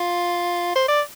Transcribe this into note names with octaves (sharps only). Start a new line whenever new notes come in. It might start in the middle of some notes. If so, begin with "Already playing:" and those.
Already playing: F4
C5
D5